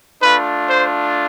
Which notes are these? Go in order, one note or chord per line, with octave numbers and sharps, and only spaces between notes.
A3 D4 F4 B4
C5